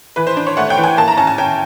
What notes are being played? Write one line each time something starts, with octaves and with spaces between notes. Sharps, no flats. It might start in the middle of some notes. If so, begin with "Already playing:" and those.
E3 B4
C5
D4
C#5
A3 F#5
G5
E3
G#5
A#3 A5
A#5
C#4 A5
G#5
C#4 G5